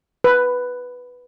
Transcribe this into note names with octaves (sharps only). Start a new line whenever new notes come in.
B4